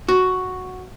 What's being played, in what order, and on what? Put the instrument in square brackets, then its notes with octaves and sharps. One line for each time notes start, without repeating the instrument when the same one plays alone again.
[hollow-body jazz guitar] F#4